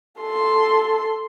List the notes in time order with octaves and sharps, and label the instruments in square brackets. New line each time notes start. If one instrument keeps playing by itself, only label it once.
[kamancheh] A4 C6